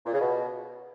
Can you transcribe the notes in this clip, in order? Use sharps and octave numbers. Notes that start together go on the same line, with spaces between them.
A#2
C#3
B2